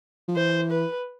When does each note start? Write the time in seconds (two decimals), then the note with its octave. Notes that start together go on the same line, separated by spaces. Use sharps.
0.28 F3
0.36 E3 C5
0.71 B4